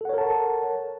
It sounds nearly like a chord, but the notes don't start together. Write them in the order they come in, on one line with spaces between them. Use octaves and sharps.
A4 F#5 C#5 A#4 A5